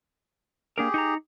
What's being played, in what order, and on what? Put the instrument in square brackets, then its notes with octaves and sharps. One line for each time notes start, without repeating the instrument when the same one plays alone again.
[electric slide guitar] A#3 D4 A#4 [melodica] G4 G#4
[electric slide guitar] D#4 A#5